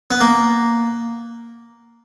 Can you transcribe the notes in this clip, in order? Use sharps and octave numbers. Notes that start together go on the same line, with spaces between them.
B3
A#3